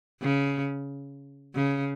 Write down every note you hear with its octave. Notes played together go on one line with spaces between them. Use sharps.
C#3
C#3